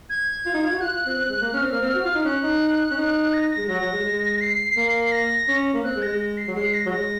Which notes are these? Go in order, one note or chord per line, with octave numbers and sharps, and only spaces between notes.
G#6
F4
D#4
F4
F#4
F4 F#6
F4
C4
C4
G#3
A#3
C#4 F6
C4
A#3
C4
F#4
F4
D#4
C#4 F#6
D#4
C#4
D#4
A#6
A#6
G#3
F#3 A#6
F#3
G#3
G#3
C7
A#3
C7
A#6
C#4
A#3
C4 F#6
G#3
A#6
G#3
A#6
C7
F#3
G#3 C7
A#6
F#3
G#3 A#6